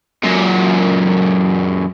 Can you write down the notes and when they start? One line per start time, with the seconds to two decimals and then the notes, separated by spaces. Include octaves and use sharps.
0.24 F#2 A#2